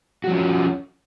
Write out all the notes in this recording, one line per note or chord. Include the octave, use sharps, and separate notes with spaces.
F3 C#4 F#4